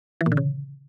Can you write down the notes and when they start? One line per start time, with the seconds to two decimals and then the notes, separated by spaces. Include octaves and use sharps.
0.21 E3
0.26 A#2
0.32 D3
0.37 C#3